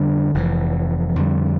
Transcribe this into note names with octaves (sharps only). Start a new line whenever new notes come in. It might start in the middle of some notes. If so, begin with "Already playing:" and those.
Already playing: F2 D3 G3 D4
F1 F2 C3 E3
F2 D3 G3